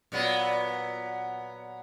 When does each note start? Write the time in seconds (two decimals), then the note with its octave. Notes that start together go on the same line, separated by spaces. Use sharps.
0.12 A#2 F#3 B3